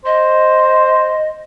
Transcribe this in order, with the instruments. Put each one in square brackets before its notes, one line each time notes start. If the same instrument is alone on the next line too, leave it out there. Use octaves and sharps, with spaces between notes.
[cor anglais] C5 [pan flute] D#5